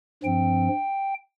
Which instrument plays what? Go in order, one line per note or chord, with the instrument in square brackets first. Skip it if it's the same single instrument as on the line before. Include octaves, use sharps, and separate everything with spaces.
[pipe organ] G2 F3 C4 G5